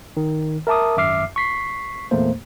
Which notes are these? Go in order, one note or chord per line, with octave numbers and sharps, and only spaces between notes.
D#3
A#4 E5 A5 D6 D#6
G#1 F#2 E5 D6 F6 C7
C#6 B6 C7
E2 A#2 A3 A#3 C5